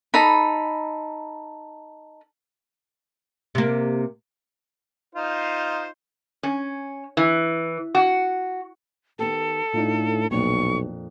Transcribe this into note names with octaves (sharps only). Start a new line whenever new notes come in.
D#4 A4 B5
C3 A#3
D#4 F4 C5
C#4
E3
F#4
D#3 B3 G4 A4
A2 D4 D#4 F4
B1 F2 A#2 D4 C#6